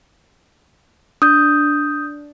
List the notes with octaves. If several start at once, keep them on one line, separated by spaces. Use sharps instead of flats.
D4 D#6 G6